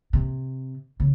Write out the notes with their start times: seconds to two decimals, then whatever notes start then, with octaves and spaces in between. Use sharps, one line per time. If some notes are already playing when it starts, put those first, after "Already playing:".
0.13 C3
1.00 C#3